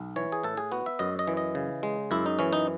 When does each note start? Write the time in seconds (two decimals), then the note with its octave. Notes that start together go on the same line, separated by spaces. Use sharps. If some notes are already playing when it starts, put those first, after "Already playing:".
Already playing: B1
0.16 E3 C#5
0.32 G#4
0.43 A2 A4
0.57 G#4
0.72 B3 F#4
0.86 E5
0.99 F#2 D#5
1.19 D#5
1.27 E3
1.37 D#5
1.55 C#3
1.83 G#3
2.11 F#2 E4
2.26 D#4
2.39 E3 C#4
2.53 D#4